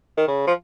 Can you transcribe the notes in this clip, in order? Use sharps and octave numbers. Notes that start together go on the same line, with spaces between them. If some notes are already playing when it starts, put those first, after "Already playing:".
D#3
C#3
F3